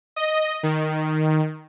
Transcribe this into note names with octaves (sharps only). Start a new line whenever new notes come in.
D#5
D#3